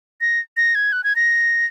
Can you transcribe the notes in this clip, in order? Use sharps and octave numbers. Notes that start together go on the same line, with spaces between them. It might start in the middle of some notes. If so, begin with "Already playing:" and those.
A#6
A#6
G#6
F#6
G#6
A#6